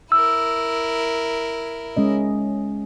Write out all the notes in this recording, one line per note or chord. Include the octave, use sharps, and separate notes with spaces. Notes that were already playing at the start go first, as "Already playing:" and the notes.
E4 A#4 E6
G#3 C#4 D#5